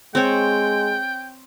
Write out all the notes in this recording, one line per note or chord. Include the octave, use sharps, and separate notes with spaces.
G#3 C4 C#5 G5